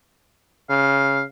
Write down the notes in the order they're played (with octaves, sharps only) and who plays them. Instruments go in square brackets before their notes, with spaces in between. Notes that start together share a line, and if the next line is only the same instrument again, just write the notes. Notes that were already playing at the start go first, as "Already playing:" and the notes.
[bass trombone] C#3 [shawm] F5